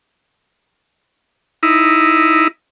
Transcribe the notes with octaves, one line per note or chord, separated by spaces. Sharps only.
D#4 E4